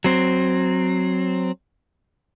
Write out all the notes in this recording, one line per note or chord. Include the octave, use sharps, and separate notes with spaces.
F#3 C4